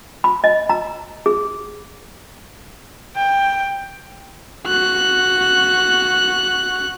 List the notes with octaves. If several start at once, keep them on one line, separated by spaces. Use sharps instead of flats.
B5
D#5
A#5
G#4
G5
F#4 F#6